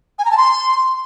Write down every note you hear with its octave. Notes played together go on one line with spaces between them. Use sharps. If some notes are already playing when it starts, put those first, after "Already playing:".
G#5
A#5
A5
C6